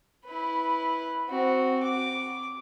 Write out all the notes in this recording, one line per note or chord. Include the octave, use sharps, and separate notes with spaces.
E4 B4
C4 F#4
D6